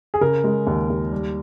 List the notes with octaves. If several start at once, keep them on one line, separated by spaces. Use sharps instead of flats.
G#4
C#3 A#4
G#3
D#2
D#2
G3